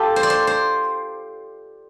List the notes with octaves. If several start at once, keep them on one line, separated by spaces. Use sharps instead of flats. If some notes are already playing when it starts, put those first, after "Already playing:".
Already playing: F4 G4 A4
C5
D5
C5
C5